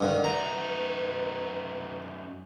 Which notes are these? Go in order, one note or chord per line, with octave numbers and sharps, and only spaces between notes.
G2 D3 D#3 B4
F#2 A3 D#4 A#5